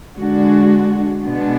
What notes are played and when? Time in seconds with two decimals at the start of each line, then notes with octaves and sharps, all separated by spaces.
0.17 D3 G#3 D4 F#4
1.22 B2 G#3 B3 D4